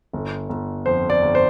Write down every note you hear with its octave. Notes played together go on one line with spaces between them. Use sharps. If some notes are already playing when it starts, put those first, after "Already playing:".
G1
G1
F2 C5
D5
G1
C5